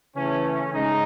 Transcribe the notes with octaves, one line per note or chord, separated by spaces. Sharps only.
C#3 E3 A3 C#4
C#4
C#3 G#3 D#4